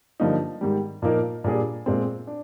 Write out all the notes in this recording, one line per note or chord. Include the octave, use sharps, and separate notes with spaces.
G2 D3 F3 A#3 D#4
G#2 D#3 G3
A#2 F3 A#3 D#4 A#4
A#2 G3 D4 G#4
A#2 G#3 C4
D4